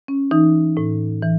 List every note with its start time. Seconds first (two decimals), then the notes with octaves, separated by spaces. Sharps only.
0.08 C#4
0.31 E3 D#4
0.77 A2
1.22 E3